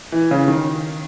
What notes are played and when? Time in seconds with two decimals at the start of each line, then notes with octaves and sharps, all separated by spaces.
0.12 E3
0.31 C#3
0.48 D#3